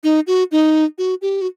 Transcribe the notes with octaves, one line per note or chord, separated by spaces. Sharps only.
D#4
F#4
D#4
F#4
G4
F#4